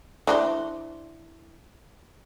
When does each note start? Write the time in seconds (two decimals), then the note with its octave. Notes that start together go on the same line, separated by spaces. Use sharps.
0.27 E3 D4 C5